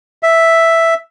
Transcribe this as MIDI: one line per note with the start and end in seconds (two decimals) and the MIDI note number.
0.23 0.94 76